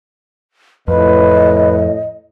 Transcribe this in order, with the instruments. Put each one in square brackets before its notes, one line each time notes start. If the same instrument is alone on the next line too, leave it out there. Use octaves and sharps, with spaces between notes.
[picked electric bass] F2 [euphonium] A2 [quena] B4 [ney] D#5